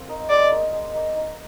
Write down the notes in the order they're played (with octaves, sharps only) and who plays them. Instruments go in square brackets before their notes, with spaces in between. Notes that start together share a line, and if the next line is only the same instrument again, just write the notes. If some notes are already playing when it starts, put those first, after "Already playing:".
Already playing: [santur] A#3 C4
D#4 A#4
[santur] G#3 [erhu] D5
[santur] D#4 A#4 D5
G#3
D#4 A#4 D5
D#4